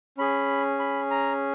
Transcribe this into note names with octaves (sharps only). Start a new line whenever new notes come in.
C#4 G#4 B5
B5
A#5